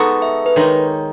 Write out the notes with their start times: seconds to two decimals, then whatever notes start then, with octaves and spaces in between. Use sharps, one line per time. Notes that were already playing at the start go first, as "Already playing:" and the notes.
Already playing: G#3 B3 D#4 F#4 A4
0.22 E5
0.46 B4
0.56 D#3 G#3 D#4 C#5